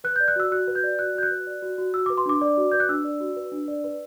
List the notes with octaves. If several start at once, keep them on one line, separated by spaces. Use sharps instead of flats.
B4 F#6
D5 G6
F#6
F#4 E6
F#4 F#6
B4
G6
D5
F#4 F#6
F#4 G6
F#6
B4
D5
F#4
F#4
F#4 E6
B4 D6
C6
D4 D6
D5
F#4
B4 G6
F#6
D4 E6
D5
F#4
B4
D4
D5
B4